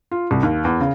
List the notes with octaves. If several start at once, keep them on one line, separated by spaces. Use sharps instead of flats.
F4
C2
D#2
E2
C#3